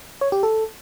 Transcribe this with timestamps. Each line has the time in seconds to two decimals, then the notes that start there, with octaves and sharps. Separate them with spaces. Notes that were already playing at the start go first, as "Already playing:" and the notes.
0.21 C#5
0.32 G4
0.43 A4